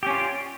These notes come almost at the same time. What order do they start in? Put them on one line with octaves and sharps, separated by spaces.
G4 C#4 F4 D5